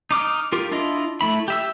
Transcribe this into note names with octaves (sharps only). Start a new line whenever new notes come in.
D#4 D6 F6
F4 G4 A#4
D4 E4 F4 D#5
A3 E4 B5
G4 E5 E6